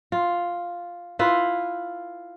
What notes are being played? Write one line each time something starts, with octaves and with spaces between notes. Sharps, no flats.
F4
E4 F4 B4